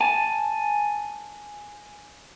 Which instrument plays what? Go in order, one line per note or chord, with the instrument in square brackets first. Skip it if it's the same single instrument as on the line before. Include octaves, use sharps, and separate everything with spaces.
[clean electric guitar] G#5 A5